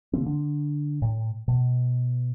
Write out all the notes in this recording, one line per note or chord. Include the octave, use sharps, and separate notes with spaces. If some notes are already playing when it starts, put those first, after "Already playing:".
C#3 E3 A#3 C4
D3 D4
A2
B2